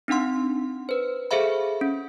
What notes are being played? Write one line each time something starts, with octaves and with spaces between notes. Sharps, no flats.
C4 D4 D#4 F#5 C6
B4 C5
G#4 A4 C5 E5 F5 B5
C#4